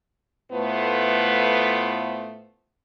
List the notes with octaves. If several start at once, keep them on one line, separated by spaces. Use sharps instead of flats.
A2 A3 B3 F4 B4 C5